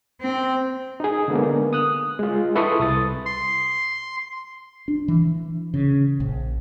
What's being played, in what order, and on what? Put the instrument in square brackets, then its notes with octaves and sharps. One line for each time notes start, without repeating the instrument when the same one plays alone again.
[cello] C4
[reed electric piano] D#4 G#4
D3 G#3 A#3 B3
D#6 F#6
G#3 F4
E4 A4 B4 C6 C#6 D#6
C2 D#6 A6
[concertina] C6
[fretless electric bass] D4
E3
C#3
A#1